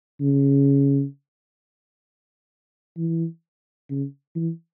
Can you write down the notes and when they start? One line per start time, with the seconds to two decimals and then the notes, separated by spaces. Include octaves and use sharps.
0.21 C#3
2.97 E3
3.90 C#3
4.36 E3